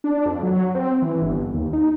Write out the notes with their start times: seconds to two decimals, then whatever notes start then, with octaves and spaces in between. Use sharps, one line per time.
0.04 D4
0.26 F2
0.43 F#3
0.75 C4
1.02 E3
1.22 G1
1.54 D#2
1.73 D#4